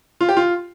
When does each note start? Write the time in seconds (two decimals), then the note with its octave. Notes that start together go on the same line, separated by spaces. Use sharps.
0.21 F4
0.29 G4
0.37 F4